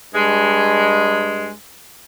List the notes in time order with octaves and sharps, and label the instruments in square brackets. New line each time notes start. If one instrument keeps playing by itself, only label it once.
[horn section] G2 G#3